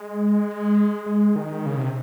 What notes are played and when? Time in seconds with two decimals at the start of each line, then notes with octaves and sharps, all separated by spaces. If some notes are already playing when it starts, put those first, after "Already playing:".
Already playing: G#3
1.06 G#3
1.36 D#3
1.66 C#3
1.77 C3